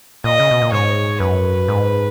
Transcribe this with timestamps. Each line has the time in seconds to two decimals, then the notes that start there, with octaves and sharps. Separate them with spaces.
0.24 A#2 D#5
0.40 C#3
0.51 B2
0.62 A#2
0.72 G#2 C#5
1.20 F#2 B4
1.68 G#2